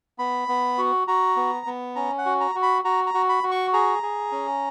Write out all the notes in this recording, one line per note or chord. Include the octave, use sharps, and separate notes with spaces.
B3 B5
B3
F#4
F#4 A#5
B3
B3
C#4 A#5
F#5
F#4
A#5
F#4
B5
F#4 A#5
A#5
F#4
B5
F#4
C#6
G#4 A#5
G#4
C#4